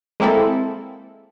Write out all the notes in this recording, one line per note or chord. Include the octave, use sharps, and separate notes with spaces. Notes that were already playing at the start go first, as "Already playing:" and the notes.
G#3 A#3 C4 E4 A4